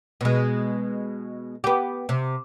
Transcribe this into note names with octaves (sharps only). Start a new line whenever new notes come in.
B2 G#3
B3 G4
C3